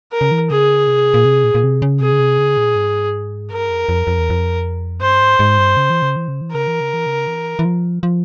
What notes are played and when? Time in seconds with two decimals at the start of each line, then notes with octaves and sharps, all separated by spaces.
0.12 A#4
0.21 C#3
0.31 E3
0.50 C#3 G#4
0.87 C3
1.14 A#2
1.25 C3
1.44 A#2
1.55 A#2
1.64 C3
1.82 C#3
2.01 C3 G#4
2.12 C#3
2.19 C3
2.38 C#3
2.57 A#2
2.75 G#2
3.51 G2 A#4
3.70 F2
3.89 F2
4.07 F2
4.18 E2
4.30 F2
5.01 G2 C5
5.21 G#2
5.39 G#2
5.58 G2
5.77 C#3
5.90 E3
6.02 C#3
6.16 E3
6.28 C#3
6.41 E3
6.52 C#3 A#4
6.67 E3
6.81 C#3
6.94 E3
7.06 C#3
7.27 E3
7.59 E3
7.65 F3
8.03 F3